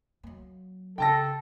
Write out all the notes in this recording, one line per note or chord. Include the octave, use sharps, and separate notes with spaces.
F#3 A#3
C#3 A4 G5 A5 A#6